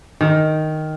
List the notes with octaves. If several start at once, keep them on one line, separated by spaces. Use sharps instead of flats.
D#3